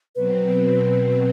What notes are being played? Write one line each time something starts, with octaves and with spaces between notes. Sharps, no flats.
B2 F#3 C4 B4